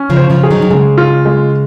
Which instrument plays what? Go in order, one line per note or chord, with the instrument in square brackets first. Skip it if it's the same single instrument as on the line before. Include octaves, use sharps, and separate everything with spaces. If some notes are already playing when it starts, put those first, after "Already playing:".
Already playing: [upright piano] C#4
[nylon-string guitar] C#3 F3
[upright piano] C5
[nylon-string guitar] C#3 F3
[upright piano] G#4
[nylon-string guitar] D#3 F#3
D#3
[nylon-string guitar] C#3 [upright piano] G#3
[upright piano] F4
G#3